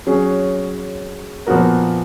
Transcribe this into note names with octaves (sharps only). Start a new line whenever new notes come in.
F#3 C#4 G#4
A#2 F3 B3 F#4 A#4